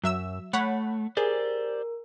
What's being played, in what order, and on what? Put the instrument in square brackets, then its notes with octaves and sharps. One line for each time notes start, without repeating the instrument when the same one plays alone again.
[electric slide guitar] F#2 [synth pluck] F#3 E5 E6
[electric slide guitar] A3 [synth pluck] C#5 F#5 B5
[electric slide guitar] G4 C5 D5 [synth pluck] G#4 [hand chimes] A#4